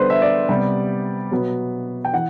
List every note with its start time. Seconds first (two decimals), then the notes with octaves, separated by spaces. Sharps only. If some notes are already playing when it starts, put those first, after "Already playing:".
Already playing: D3 G3 B3 B4 C5
0.10 E5
0.22 D5
0.49 C3 G3 B3
1.31 B2 F#3 B3
2.05 G5
2.14 E3 F#5